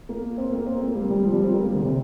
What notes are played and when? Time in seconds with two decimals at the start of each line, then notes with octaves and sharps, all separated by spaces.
0.09 A#3
0.38 C4
0.52 A#3
0.66 C4
0.81 A#3
0.95 G3
1.10 G3
1.25 F3
1.34 G3
1.44 C4
1.53 A#3
1.63 G3
1.73 D3
1.82 C3